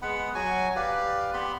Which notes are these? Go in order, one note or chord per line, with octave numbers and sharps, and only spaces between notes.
G#3 B3 F#5 B5
F#3 F#4 G#5 C#6
G4 B4 D5 F5
B3 G4 B5 C6